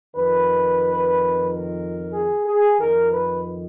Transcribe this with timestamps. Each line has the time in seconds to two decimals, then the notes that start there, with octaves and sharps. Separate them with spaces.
0.15 F2 D#3 B4
1.47 A#4
2.13 G#4
2.46 G#4
2.79 F2 D#3 A#4
3.12 B4